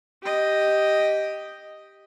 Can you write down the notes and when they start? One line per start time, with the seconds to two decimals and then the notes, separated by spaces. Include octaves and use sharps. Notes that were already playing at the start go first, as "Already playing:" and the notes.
0.23 G4 D#5